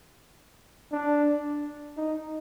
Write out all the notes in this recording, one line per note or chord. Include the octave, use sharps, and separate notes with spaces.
D4
D#4